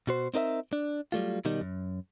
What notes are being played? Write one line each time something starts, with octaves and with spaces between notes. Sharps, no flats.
B2 F#4 C5
C4 D#4 A#4 D#5 E5
D4
F#3 G3 A3 F4
B2 D#3 G3 D#4
F#2